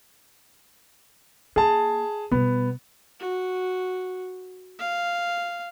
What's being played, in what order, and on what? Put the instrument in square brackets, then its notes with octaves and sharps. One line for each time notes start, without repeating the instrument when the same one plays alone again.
[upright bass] A#3 [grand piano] G#4 A5
[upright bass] B2 G3 [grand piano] B3
[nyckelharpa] F#4
F5